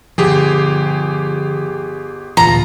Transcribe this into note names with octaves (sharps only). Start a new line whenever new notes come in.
G1 D3 F3 G4 G#4
D1 A#2 E3 F4 A#5